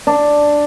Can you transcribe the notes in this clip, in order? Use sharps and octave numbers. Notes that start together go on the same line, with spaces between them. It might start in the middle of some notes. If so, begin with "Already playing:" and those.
D4